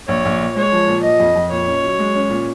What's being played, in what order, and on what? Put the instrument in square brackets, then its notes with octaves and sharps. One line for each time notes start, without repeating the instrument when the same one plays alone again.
[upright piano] A#1 [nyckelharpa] C#5
[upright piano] A#1
A#2
[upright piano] G#3 [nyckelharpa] C#5
[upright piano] F3
A#2
[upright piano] F3 [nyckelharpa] D#5
[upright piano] F2
F2
[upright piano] A#2 [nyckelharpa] C#5
[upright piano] C#4
F#3
G#3
C#4
A#2